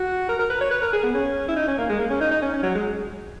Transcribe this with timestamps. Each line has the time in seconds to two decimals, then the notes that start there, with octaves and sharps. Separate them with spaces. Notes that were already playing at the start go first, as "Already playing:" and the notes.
Already playing: F#4
0.29 A#4
0.39 A#4
0.50 B4
0.61 C#5
0.71 B4
0.82 A#4
0.93 G#4
1.03 B3
1.14 C#4
1.49 E4
1.56 D#4
1.68 C#4
1.78 A#3
1.90 G#3
2.00 A#3
2.10 C#4
2.21 D#4
2.31 D#4
2.42 C#4
2.54 C#4
2.63 F#3
2.75 G#3